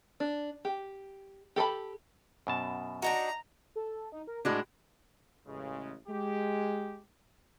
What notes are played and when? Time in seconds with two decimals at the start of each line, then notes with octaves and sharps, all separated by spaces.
0.20 D4
0.65 G4
1.56 G4 A4 A5 B5
2.47 F#2 B2 A5
3.02 D4 D#4 F#4 A#5
3.76 A4
4.12 D#4
4.27 A#4
4.45 A2 G#3 D4 F#4
5.47 A1 C#3 G#3
6.08 G#3 G4